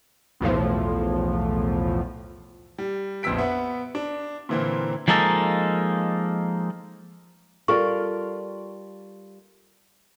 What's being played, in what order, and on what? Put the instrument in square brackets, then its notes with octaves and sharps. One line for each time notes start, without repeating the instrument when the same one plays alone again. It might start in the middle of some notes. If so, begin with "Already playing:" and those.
[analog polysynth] B1 E2 A2 F3
[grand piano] G3
A#1 F2 B3 E6 B6 D7
B3 E5 F#5
D4
A#2 D3 E3 A#3 C4
[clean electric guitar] F3 G#3 A#3 D#4 A4
[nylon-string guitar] G3 F4 [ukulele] A4 A#4 D5 [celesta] C#6